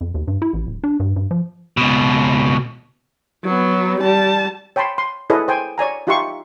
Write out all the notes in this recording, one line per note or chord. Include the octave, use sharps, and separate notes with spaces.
F2
D#2
G2
E4
A1
D1
D4
G2
G2
F3
C#2 B2
F#3 B3
G3 A5
C#5 G5 A5 B5 C6
C6
E4 G#4 A4 B4 C#5 D#5
C5 G5 G#5
C#5 D5 G#5 A#5
D#4 F4 G4 E5 C6 C#6